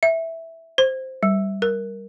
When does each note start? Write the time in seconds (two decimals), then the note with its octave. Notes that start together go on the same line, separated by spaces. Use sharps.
0.03 E5
0.78 C5
1.23 G3
1.62 A#4